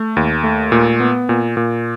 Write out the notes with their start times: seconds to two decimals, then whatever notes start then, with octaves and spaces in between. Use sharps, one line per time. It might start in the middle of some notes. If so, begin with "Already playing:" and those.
Already playing: A3
0.17 D#2
0.43 A3
0.72 A#2
1.00 B3
1.29 A#2
1.57 A#2